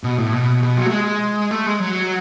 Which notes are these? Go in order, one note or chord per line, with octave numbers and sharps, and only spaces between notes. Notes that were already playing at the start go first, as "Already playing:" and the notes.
B2
A2
B2
B2
F#3
A3
G#3
A3
G#3
F#3